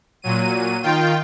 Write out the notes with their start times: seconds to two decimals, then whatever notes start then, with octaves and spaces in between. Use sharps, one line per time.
0.22 A#2 F#3 D#7
0.83 D#3 F4 G5